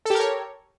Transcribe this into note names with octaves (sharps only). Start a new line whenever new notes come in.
G4 A4 A#4 C#5